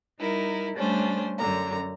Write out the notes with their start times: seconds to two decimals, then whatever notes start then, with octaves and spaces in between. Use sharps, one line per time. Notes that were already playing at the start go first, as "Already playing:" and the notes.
0.19 G3 D#4 E4 A#4
0.75 G3 A3 C#4 D4 C5
1.37 F#2 D3 A#5